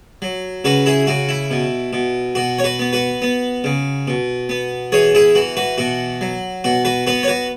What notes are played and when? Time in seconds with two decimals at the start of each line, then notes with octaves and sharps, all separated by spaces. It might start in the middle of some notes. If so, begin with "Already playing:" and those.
0.22 F#3
0.64 C#3 F#4 B4
0.86 E4 G#4
1.07 C#3 F#4
1.29 E4
1.51 B2
1.93 B2
2.35 B2 F#4
2.59 C#5
2.64 F#4 B4
2.79 B3
2.93 F#4 B4
3.22 B3
3.64 C#3
4.08 B2
4.49 B3
4.92 E3 G#4 C#5
5.15 E4 G#4
5.35 E3 F#4
5.57 F#4 B4
5.78 B2 F#4
6.21 F#3
6.64 B2 F#4
6.85 F#4 B4
7.07 B3 F#4 B4
7.23 C#5
7.28 F#4 B4